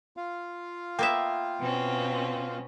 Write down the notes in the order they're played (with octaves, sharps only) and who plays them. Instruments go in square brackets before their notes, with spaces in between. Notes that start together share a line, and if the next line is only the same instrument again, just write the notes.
[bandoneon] F4 F5
[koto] A#3 B3 E5 [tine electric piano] G5
[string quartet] B2 C4 C#4